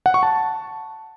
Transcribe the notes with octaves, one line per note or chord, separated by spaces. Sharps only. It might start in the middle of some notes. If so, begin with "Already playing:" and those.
F#5
C#6
A5